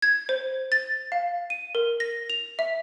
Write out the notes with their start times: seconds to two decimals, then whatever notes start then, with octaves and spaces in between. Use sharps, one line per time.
0.02 G#6
0.29 C5
0.72 A6
1.12 F5
1.50 D#7
1.75 A#4
2.00 A#6
2.30 F7
2.59 E5